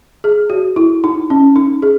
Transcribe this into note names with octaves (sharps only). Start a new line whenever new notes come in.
G#4
F#4
E4
D#4
C#4
D#4
G#4